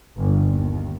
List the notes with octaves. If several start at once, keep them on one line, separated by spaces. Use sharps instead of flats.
G1
D#2